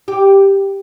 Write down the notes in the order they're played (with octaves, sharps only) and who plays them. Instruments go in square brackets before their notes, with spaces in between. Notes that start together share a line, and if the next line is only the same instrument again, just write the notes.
[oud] G4